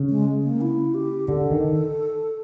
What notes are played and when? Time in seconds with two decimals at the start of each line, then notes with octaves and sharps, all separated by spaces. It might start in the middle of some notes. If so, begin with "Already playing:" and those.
Already playing: C#3
0.10 G#3
0.44 A#3
0.61 E4
0.94 G4
1.28 D3 A4
1.51 D#3